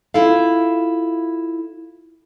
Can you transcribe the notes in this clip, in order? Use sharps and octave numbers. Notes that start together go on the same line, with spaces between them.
E4 F4 A4 F5